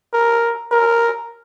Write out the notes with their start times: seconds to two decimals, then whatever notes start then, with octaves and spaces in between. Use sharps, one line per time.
0.13 A#4
0.72 A#4